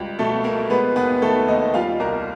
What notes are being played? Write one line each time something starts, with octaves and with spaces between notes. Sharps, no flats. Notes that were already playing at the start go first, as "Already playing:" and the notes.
Already playing: C#2 G3
B2 A3 A4
A#3 A#4
G#3 B3 B4
D#2 B3 B4
D#3 A3 A4
D#2 D#4 D#5
G3 F4 F5
C2 A#4 A#5